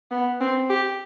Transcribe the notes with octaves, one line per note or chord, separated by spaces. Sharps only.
B3
C4
G4